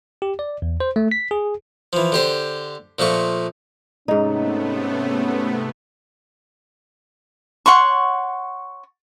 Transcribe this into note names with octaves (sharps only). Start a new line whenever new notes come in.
G4
D5
E2
C5
A3
B6
G#4
E3 F3
D3 G4 C5
A#2 F3 A3 C#6
G#2 C3 A3 B3 C#4 D#4
C#5 F#5 C6 C#6